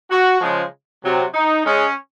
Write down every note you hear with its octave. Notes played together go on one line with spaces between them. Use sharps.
F#4
C#3 F3 G#3
C3 F#3
D#4
C#3 G#3 C#4